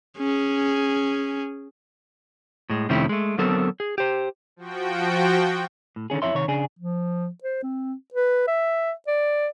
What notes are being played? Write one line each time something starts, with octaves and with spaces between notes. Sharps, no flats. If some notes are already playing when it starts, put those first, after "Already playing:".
C#4 G#4
A2 G#3
F2 C3 D#3 A3 C#4 E4
G#3 A3
D3 F#3 B3 C4 A4 A#4
G#4
G4 C5
F3 F#4 G5
A2
D3 D#3 C#4 G#4
F2 G#2 E4 C#5 E5 C6
C3 D#3 C#5
C#3 D4 G#4
F3
C5
C4
B4
E5
D5